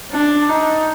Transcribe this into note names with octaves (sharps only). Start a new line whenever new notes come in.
D4
D#4